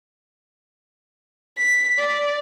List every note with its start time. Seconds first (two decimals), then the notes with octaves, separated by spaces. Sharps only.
1.57 B6
1.98 D5